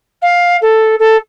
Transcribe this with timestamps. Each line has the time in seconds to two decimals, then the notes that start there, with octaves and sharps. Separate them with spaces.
0.22 F5
0.61 A4
0.99 A4